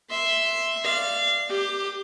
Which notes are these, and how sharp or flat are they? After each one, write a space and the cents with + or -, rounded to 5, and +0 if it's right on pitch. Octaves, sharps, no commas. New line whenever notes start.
E5 +0 C6 +0
D5 +0 F5 -25
G4 +0 D6 +25